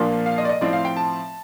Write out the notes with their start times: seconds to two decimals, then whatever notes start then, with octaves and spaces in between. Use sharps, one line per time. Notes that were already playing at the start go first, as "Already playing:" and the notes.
Already playing: A#2 F3 A#3 D4
0.26 F5
0.38 D#5
0.45 D5
0.49 D#5
0.61 A2 F3 C4 D5
0.73 F5
0.85 G5
0.96 A5